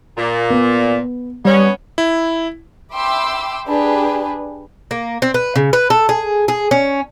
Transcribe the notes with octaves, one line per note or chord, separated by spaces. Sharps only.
A#2
B3
G3 B3 C#4
E4
E5 G5 B5 C6 D6 E6
D4 G4 G#4 B4
A#3
C4
B4
C#3
B4
A4
G#4
G#4
C#4